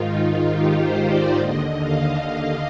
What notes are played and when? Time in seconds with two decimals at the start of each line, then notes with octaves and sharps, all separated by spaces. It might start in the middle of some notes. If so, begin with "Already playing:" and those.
Already playing: G#2 D#3 D#4 F4
0.21 F4
0.49 G4
0.79 C5
1.07 D5
1.35 D#2 D3 D#5
1.79 F5
2.21 D#5